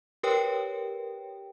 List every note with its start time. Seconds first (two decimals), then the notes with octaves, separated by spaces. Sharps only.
0.23 G4 A#4 B4 C#5 G5